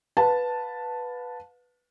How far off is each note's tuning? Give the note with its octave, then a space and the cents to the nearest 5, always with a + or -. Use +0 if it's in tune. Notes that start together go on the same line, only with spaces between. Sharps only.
B4 +0 F5 +40 A5 +0